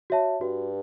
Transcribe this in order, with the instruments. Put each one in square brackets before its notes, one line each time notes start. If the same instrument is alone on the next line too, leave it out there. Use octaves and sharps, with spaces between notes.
[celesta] F#4 C#5 E5 A5
[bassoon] G2 [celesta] F#4